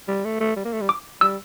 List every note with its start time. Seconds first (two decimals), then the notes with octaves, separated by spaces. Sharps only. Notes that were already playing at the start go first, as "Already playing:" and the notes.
0.08 G3
0.25 A3
0.41 A3
0.57 G3
0.65 A#3
0.73 A3
0.81 G3
0.89 D6
1.21 G3 E6